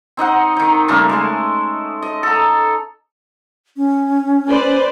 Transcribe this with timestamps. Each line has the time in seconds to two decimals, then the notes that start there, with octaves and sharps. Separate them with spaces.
0.17 C4 D#4 D#5 F#5
0.57 D#3 D#4
0.88 C#3 G3 A3 A#3
1.09 G#3 A3 C6
2.02 D#5
2.23 A4 A#5
3.77 C#4
4.49 B4 C5 D5